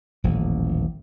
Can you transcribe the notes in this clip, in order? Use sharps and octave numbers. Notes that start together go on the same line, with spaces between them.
D#1 A1 F3